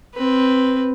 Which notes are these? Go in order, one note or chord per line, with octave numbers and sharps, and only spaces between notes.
C4 B4